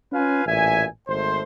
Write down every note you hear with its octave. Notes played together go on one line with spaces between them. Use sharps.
C#4 F4 B4 F5 G#5
A1 A#2 E5 G#5
G#1 A3 C5